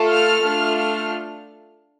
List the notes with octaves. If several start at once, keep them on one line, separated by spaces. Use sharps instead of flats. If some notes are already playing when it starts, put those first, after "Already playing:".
Already playing: A3 F4 A4
F6
A3 D4 F4 A4
F6